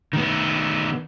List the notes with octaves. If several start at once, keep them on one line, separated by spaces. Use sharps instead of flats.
D#3 B3